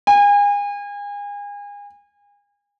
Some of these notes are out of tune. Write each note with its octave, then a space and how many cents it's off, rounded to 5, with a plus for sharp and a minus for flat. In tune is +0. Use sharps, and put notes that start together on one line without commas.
G#5 -35